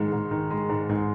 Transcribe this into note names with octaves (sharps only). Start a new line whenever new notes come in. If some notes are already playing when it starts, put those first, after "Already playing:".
Already playing: G#2 D#3 G#3
G#2
D#3
G#3
G#2
G#2